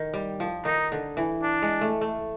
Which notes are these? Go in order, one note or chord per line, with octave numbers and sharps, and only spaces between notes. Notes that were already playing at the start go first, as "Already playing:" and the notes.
Already playing: D#3
G3
F3
D#3 D#4
D3
E3
D4
G#3
A3
A3